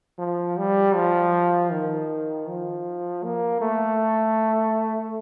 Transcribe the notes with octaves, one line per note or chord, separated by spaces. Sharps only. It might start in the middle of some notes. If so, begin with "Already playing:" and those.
F3
G3
F3
D#3
F3
A#3
A3